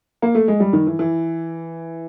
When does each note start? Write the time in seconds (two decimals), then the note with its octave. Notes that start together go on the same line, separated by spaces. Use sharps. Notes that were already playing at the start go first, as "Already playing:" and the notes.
0.22 A#3
0.35 A3
0.48 G#3
0.60 G3
0.73 D#3
0.87 E3
0.99 E3